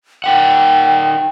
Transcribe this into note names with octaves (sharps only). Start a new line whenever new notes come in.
D#4 A#4 F#5 G5